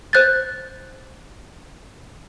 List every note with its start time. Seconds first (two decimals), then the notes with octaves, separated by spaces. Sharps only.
0.13 C5 F#6 G6 A6